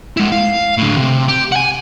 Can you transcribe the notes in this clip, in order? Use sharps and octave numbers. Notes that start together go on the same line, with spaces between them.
G#3 E4
F5
A2 D3
C3
G4
F#5 G#5